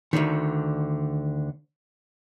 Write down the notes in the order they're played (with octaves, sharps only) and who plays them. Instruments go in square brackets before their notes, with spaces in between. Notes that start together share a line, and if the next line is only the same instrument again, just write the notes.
[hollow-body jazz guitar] D2 G#2 D3 D#3